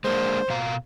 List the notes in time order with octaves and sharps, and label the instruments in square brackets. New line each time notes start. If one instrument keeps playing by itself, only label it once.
[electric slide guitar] G#3 A#3 D4 [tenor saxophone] C5
[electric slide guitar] B2 F5 A#5